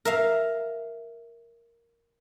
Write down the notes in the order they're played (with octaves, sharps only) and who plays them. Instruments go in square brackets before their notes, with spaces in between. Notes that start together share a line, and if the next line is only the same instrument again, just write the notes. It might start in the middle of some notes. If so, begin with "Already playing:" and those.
[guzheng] A#4 E5 F5